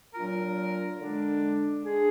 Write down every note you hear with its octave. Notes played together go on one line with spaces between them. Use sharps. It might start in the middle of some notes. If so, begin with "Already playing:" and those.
A#2 F#3 D4 F4 A#4
D3 G#3 D4
G#3 D4 G#4